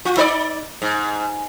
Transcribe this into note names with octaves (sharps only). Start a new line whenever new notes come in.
F4
D#4 C5 D5
G#2